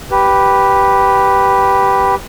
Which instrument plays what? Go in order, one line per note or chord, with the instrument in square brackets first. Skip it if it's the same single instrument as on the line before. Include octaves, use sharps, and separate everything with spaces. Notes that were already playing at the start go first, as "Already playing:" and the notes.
[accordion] G4 B4